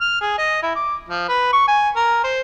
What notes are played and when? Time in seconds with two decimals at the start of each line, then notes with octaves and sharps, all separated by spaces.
0.01 F6
0.21 G#4
0.38 D#5
0.63 E4
0.76 D6
1.09 F3
1.28 B4
1.53 C#6
1.68 G#5
1.96 A#4
2.24 C5